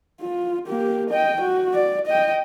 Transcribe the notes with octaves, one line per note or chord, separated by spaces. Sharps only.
F4
A#3 G4
D#5 G5
F#4
D5
D#5 G5